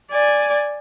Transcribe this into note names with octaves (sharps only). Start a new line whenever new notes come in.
D5 G#5